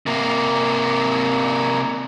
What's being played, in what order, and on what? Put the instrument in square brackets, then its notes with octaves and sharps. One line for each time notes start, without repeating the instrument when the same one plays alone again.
[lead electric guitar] C3 A#3